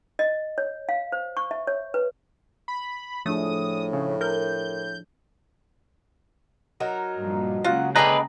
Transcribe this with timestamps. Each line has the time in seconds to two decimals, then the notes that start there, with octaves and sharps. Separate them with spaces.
0.19 D#5
0.58 C#5
0.89 F5
1.12 C5
1.37 C#6
1.51 E5
1.67 C#5
1.94 B4
2.68 B5
3.26 A2 F3 A3 D4 G#4 D#6
3.93 C#3
4.21 A#4 G6
6.80 F#3 D#4 A#4
7.19 G2 A#2 F3
7.64 C#3 F#3 G#3 A#3 F4 F#5
7.96 D3 G#4 B4 D5 D#5 G5 A#5